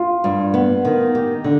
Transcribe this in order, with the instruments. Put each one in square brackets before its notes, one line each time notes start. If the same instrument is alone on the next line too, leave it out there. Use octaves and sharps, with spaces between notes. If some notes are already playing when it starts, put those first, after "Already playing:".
Already playing: [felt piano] F4
[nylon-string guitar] G2
B3
D#3
G4
D3